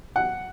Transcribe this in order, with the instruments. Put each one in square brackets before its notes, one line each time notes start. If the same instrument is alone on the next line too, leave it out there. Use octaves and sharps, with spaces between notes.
[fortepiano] F#5